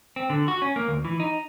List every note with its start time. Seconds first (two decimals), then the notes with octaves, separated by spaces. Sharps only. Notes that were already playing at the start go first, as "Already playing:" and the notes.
0.16 C4
0.30 D3
0.48 F#4
0.62 C#4
0.76 A#3
0.88 D2
1.05 E3
1.20 D#4